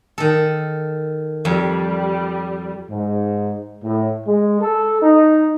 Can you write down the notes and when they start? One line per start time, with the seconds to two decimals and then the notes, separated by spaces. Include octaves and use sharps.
0.18 D#3 A4
1.45 F2 G3
2.91 G#2
3.83 A2
4.26 G#3
4.61 A4
5.03 D#4